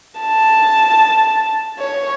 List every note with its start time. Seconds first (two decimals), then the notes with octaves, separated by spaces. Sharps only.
0.21 A5
1.79 C#5